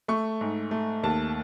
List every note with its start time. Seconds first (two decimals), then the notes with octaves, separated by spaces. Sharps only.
0.08 A3 C#6
0.41 G#2
0.71 A3
1.03 D#2 A5